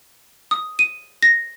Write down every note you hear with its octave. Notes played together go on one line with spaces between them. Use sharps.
D#6
D#7
A#6